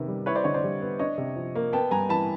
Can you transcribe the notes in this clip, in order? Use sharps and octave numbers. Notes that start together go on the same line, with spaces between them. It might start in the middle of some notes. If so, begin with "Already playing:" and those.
Already playing: C3 D#3 B3
G3
E4 B4 C#5
C5 D5
D3 C#5 D#5
C5 D5
G3
B3
D4 C#5 D#5
C3
F3
A#3
B3 G5 A5
G2 G#5 A#5
E3 A5 B5